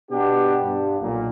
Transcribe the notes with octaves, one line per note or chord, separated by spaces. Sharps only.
B2 B3 D4 G4
G2
B1 A#2